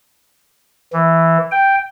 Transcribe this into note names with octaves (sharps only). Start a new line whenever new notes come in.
E3
G5